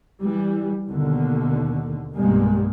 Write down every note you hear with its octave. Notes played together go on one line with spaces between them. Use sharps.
E3 G3
D#2 B2 D3
B1 G2 A#2 G3 G#3 A#3